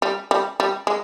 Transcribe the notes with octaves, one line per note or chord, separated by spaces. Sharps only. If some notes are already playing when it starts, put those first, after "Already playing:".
G3
G3
G3
G#3